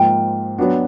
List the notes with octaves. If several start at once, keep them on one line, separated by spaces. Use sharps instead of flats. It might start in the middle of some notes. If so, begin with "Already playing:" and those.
Already playing: G#2 F3 A#3 G5
F#3 B3 D4 F#4